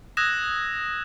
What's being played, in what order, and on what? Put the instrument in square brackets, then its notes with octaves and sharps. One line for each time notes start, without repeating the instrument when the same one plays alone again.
[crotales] D#6 E6 F#6 G#6 A#6 E7